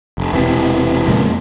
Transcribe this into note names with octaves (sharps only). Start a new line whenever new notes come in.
F1
E1 A#1 C3 E3
F2 A#2 C#3 G#3